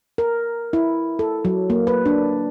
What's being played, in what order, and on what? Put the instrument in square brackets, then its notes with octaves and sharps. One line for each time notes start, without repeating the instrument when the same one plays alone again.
[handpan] A#4
E4
A4
F#3
A#3
B4
D4